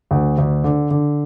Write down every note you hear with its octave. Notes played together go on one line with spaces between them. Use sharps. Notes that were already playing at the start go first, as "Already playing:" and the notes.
D2
D2
D3
D3